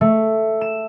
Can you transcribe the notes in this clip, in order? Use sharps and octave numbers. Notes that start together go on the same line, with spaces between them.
A3
E7